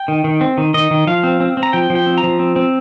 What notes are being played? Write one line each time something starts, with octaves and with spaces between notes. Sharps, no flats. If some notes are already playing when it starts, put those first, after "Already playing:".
Already playing: G5
D#3
D#3
C4
D#3
D#3 D#5
D#3
F3 F5
C4
C4
C4
A#5
F3 G5
F3
G5
C4
A#5
F3
C4
C4